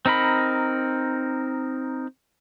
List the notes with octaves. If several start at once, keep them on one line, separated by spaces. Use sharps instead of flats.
C4 D#4 A#4 B5